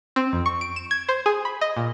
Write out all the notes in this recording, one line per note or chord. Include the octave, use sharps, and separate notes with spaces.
C4
F2
C#6
D7
E7
G#6
C5
G#4
B5
D#5
A#2